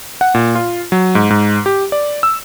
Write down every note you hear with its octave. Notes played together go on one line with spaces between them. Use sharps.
F#5
A#2
F4
F#3
G#2
G#2
G4
D5
E6